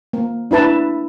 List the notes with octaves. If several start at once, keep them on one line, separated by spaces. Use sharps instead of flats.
A#3
D4 E4 B4 A5